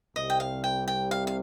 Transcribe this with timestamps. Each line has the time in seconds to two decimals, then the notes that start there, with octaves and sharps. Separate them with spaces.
0.15 C2 C3 G3 D#5
0.30 G5
0.40 F5
0.64 G5
0.88 G5
1.11 F5
1.27 F5